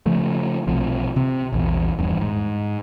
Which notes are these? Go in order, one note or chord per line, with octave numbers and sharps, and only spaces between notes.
C#3 F3 A3
B1 C3 F3
C3 C4
A#1 E2
D#1 E2 G2
G#2